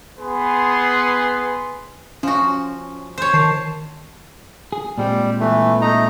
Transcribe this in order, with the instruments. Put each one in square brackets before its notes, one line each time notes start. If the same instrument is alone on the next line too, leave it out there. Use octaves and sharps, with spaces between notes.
[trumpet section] B3 G#4 B4 C6
[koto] F3 F#4 [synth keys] C#4
[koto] C5 C#5
[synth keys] D#3 A5 C7
[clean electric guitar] G#4
[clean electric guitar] A#2 G#3 C4 [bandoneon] G3
[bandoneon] E3 A3
A3 D#4 A#5